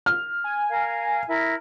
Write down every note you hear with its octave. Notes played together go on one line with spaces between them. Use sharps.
F6
G#5
A#4 F5
E4 A#4